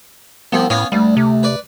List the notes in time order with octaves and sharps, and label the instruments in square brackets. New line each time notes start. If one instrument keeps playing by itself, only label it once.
[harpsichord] C2 F3 C4 [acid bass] B3
[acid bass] A2 [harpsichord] B3 C#4 F5
[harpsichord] D2 [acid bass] G3
[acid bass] C3
[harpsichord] B4 D5